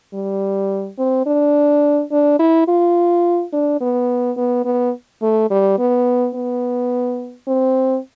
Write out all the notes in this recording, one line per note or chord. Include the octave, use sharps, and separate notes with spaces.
G3
C4
D4
D4
E4
F4
D4
B3
B3
B3
A3
G3
B3
B3
C4